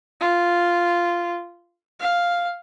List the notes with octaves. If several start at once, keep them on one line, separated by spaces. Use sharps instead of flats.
F4
F5